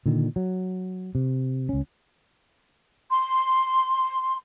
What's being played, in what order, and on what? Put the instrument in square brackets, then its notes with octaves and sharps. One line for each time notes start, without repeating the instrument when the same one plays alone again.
[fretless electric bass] A#2 D3 D#3
F#3
C3
C#2 C#4
[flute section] C6